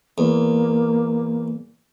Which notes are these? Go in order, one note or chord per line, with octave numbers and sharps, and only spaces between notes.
E2 A#3